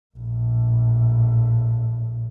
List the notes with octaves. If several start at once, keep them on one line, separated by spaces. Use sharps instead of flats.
A#1 A2